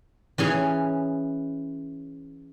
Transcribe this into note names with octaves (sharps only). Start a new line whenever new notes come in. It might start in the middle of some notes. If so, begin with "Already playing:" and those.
E3 C#4 G#4